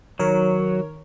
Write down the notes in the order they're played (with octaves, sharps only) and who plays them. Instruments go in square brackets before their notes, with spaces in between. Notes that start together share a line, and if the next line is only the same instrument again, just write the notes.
[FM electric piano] D#3 A#4 C#5 [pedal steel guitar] F#3